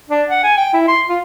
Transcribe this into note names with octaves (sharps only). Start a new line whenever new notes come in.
D4
F#5
G#5
G5
E4
C6
F4